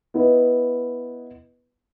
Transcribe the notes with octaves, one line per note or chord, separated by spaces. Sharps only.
B3 E4 B4 D#5